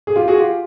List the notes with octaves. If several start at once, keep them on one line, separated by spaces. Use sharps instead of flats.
G#4
F4 G4
F#4 G#4
F4 G4